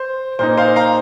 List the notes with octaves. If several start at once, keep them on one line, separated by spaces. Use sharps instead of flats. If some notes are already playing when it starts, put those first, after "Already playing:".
Already playing: C5
A#2 A#3 D#4 C5
C5 F5
F5 A#5